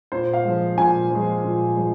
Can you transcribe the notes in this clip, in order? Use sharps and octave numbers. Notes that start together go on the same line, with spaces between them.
A#2 C5
F5
F3 G#3
A#2 G#5
F3 G#3
A#2
F3 G#3